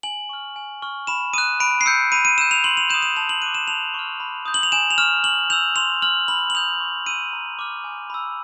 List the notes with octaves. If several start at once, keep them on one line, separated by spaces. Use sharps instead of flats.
G#5 F#7
C#6 F6
G#5
C#6 F6
B5 E7
D#6 F#6 D#7
B5 D7
C7
E6 G6 C#7
B5 D#7
D#7
E6 G6 E7
F7
C6 F#7
F7
D#6 G6 E7
E7
A5 F7
F#7
D6 F#6 D#7
E7
A5 F7
C#6 F6
B5
D#6 G6
F#7
F7
G#5 E7
F7
C#6 F6 E7
C#6 F#7
E6 G6 F7
C6 F7
F6 F#7
B5 F#7
F#7
D#6 G6 F7
C#6
E6 G6 D#7
A#5
D6 F6
G#5
B5 E6